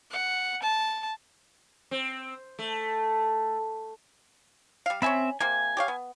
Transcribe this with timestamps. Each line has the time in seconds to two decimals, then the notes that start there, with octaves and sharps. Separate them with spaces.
0.12 F#5
0.63 A5
1.91 C4
2.59 A3
4.86 G3 F5
5.02 C4 C#4 E5 G#5 B5
5.40 C3 A#3 G#5
5.77 G4 C#5 F5
5.88 B3